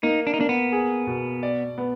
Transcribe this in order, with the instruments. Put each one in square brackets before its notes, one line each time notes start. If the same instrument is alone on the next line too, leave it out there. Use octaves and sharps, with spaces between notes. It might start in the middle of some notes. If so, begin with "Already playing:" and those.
[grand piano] A#3 [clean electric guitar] D#4
[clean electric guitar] D4
D#4
[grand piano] A#3 [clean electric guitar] D4
[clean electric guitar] B3
[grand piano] G#4
B2
D5
B3